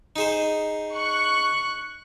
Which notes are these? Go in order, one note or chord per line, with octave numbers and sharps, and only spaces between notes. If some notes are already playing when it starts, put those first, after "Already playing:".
D#4 G#4 C5
C#6 F#6